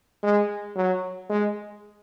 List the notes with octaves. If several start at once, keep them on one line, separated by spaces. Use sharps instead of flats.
G#3
F#3
G#3